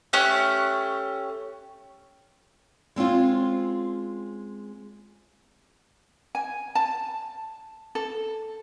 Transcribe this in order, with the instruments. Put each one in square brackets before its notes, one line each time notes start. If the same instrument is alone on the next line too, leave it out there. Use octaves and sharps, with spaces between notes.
[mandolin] A3 C#4 G4 F#6
[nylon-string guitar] G#3 C4 C#4 F4
[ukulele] G#5
A5
A4